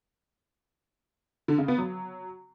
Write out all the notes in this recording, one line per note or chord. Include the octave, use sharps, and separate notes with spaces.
D3
C#3
B3
F#3